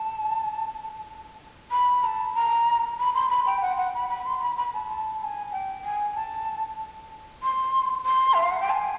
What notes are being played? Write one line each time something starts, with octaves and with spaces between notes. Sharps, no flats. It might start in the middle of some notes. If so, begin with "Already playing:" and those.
Already playing: A5
B5
A#5
A5
A#5
B5
C6
B5
G5
F#5
F#5
B5
B5
C6
B5
B5
A5
A5
A5
G#5
G5
G#5
A5
C6
C6
E5
F5
F#5
G5
A5
G#5